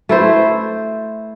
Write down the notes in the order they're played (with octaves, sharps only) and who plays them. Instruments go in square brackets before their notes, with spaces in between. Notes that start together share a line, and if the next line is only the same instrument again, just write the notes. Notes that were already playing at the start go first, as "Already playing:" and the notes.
[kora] A3 E4 C5